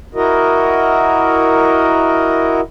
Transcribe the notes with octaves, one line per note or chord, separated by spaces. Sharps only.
E4 F#4 A#4 D#5